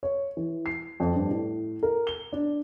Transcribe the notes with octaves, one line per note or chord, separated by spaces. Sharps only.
C#5
E3
C7
F2
G2
A2
A#4
G7
D4